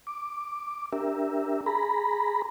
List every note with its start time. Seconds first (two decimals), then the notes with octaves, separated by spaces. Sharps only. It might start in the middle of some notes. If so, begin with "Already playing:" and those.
0.07 D6
0.93 D4 G4 A#4 E5
1.66 G#4 A#5 B5